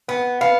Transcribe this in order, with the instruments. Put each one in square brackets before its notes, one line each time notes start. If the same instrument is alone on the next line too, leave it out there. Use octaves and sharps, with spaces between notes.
[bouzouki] B3 [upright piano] F#5
[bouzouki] B3 [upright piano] F5